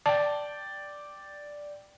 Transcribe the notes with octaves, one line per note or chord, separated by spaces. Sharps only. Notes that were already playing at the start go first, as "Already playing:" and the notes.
D5 G5 A5